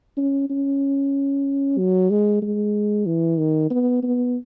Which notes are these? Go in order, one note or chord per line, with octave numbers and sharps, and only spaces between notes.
C#4
C#4
F#3
G#3
G#3
E3
D#3
B3
B3